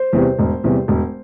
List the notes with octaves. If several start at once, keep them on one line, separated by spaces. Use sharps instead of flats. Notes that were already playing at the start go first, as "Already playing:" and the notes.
Already playing: C5
E2 C3 G3
E1
E2 C3 G3
E1